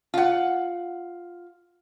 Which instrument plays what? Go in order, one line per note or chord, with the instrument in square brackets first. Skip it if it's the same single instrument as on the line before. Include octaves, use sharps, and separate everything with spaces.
[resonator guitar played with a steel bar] F4 F#5